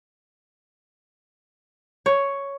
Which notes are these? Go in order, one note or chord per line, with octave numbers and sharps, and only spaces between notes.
C#5